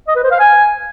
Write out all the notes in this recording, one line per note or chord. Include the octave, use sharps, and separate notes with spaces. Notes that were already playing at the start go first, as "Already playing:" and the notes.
D#5
B4
C5
F5
G#5